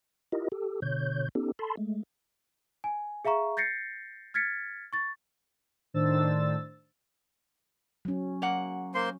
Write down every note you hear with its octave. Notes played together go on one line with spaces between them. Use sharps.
E4 F4 G4 A#4 D#5
G4 A4
B2 D3 C#5 G6
B3 C#4 D#4 G4 A4
A4 A5 B5 C6
G#3 A3
G#5
G#4 E5 F5 A#5 C#6
G6 A6 A#6 C7 C#7
F6 G#6 A6 B6 C#7
C#6 A6
A2 D#3 D4 C5 E6 A6
F#3 C#4
A#3 F#5
A#3 C5 C6